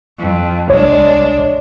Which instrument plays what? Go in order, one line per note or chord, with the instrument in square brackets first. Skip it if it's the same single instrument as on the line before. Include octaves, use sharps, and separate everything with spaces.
[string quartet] F2
[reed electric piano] C2 C#5 [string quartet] G#3 D4